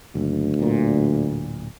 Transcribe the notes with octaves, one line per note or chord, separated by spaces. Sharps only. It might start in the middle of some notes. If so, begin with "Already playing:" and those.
F#1 D2
D1 A#2